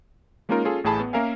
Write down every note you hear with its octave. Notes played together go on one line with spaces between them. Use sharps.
G#3 A#3 C#4 D#4 F4 A#4
C#4 F4 G#4 A4
A1 A2 G#4 A5 B5
B3
A#3 C#4 A#4 E5 F5 G#5